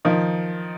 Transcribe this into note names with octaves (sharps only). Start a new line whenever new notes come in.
D#3 F3